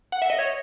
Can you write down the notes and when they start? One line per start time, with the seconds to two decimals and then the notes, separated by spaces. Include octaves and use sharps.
0.12 F#5
0.22 E5
0.30 D#5
0.39 C#5